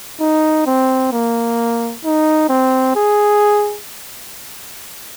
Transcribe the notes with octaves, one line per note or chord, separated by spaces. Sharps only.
D#4
C4
A#3
D#4
C4
G#4